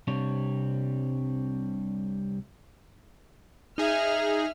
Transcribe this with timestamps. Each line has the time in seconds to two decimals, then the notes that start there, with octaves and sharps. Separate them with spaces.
0.08 C2 C3 G3 D4 C#5
3.78 D#4 G#4 E5 F6